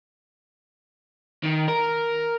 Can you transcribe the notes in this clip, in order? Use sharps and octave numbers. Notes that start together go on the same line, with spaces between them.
D#3
A#4